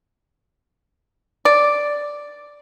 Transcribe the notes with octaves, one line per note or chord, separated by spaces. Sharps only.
D5